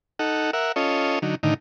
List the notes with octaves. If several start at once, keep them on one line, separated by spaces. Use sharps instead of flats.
D#4 A4 F#5
A#4 E5 F#5
C#4 F4 A4 C#5 D#5
D3 F#3 D#4
A2 D3 D#3 D#4